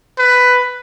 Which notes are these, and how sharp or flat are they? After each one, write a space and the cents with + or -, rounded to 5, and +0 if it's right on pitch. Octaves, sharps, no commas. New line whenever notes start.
B4 +10